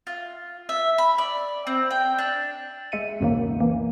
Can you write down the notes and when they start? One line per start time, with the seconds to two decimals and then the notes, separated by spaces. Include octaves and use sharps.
0.07 F4
0.69 E5
0.98 B5
1.18 D5
1.67 C4
1.91 G5
2.19 D4
2.92 G#3 E5 C#7 D#7
3.20 C#2 F#2 B2 D#3 F#3 A#3
3.60 E3 A#3